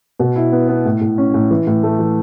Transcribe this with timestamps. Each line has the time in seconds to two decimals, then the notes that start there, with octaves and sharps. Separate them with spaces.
0.19 B2
0.36 E4
0.52 B3
0.69 B3
0.85 A2
1.01 A2
1.18 C#4
1.34 A2
1.51 E3
1.67 A2
1.83 A3
1.99 E3